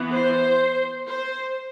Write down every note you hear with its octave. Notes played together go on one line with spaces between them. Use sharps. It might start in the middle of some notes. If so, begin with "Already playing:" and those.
Already playing: E3 B3
C5
C5